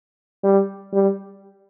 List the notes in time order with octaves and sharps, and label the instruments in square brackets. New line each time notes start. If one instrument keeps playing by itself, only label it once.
[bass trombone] G3
G3